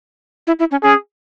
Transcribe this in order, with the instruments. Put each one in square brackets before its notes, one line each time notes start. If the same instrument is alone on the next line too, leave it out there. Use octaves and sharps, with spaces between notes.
[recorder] E4
E4
C#4
[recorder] C#4 [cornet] G#4